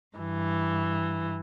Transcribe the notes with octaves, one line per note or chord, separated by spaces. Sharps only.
G2 E3